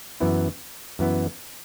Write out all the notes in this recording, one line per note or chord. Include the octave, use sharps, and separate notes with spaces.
F#2 E3 B3 E4
F#2 E3 B3 E4